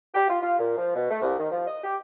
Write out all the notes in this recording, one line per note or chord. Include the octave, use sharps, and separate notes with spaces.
G4
F4
F4
A#2
F3
B2
A3
C2
D#3
F3
D#5
G4